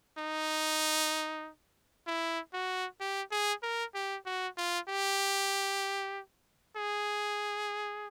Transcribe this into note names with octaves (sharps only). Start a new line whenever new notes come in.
D#4
E4
F#4
G4
G#4
A#4
G4
F#4
F4
G4
G#4